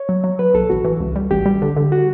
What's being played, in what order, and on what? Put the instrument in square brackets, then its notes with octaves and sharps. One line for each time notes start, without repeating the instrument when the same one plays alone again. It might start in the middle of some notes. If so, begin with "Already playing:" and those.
Already playing: [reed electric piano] C#5
[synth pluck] F#3
F#3
[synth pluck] F#3 [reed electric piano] B4
[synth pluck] B1 [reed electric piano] A4
[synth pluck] A1 [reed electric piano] F#4
[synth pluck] E3
C#2
G3
[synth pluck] A1 [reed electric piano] G4
[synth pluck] G3
D3
D3
[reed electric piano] F#4